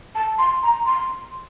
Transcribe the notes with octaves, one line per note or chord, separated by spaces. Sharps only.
A5
C6
A#5
C6